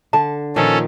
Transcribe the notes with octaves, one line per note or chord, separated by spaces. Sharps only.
D3 A5
A#2 D#3 F3 C#4 A4